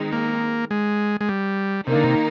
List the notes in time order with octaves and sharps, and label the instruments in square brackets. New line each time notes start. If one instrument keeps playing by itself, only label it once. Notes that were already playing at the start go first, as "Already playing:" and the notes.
Already playing: [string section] D#3 G#3 C4 D#4
[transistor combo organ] A#3
G#3
G#3
G3
[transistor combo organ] C3 [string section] D#3 A#3 D#4
[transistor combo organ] D3
C3